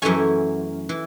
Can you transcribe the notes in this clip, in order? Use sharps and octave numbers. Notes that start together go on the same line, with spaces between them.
F#2 E3 A3 C#4 G#5
E3